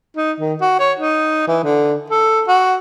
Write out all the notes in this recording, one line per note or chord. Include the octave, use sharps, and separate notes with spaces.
D#4
D#3
F#4
C#5
D#4
E3
D3
A4
F#4